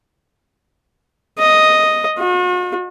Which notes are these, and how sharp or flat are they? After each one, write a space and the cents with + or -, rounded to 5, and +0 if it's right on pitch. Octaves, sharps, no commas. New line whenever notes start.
D#5 +0
F#4 -45